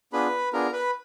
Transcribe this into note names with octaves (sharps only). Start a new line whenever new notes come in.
B3 D4 F4 G#4 B4 B5
B3 D4 F4 G#4 A#4 A#5
B4 B5